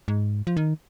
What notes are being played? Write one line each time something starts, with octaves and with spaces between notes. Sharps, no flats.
G#2
F3
D#3